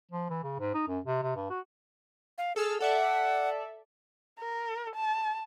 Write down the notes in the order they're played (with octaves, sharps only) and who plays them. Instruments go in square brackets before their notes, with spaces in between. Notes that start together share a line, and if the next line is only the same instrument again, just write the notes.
[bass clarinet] F3
E3
C#3
G#2
D#4
F#2
C3
C3
G2
F#4
[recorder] F5
[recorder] G#4 [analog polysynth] A4 E6 F6
[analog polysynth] A4 D5 E5 [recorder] F#5
[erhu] A#4
A5